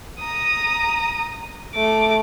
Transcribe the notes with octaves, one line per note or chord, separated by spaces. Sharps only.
A#5 D#6
A3 D6